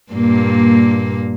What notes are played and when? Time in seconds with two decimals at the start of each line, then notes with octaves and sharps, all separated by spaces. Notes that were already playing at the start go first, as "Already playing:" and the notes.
0.13 G2 A#2 A#3